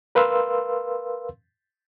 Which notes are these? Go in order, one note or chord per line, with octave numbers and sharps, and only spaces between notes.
A#4 B4 F5 C6 E6